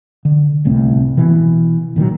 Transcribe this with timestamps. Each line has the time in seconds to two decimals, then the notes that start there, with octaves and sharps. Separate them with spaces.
0.25 D3
0.65 D1 C2 A2 C4
1.17 B2 E3
1.96 A#2 D#3 F3 F#3